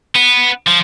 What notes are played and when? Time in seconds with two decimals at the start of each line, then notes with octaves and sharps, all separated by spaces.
0.16 B3
0.68 F3